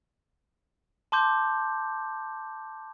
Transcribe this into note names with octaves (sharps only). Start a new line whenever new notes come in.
A5 C6 D6 G6